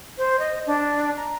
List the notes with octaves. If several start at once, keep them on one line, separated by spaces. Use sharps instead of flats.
C5
D#5
D4
A#5